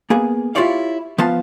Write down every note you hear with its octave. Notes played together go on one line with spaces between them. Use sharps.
A#3 B3 G#4
E4 F4 G4 C#5 D5 F5
F3 B3 F5 A5